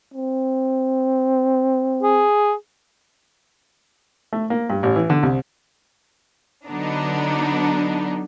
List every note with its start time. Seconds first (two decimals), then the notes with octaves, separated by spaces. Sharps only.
0.14 C4
2.02 G#4
4.33 A3
4.50 A#3
4.70 G2
4.83 A1
4.96 E3
5.10 D3
5.23 C2
6.68 D3 F#3 B3 D4 D#4